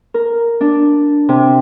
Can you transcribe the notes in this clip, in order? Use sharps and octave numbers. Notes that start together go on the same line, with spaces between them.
A#4
D4
C3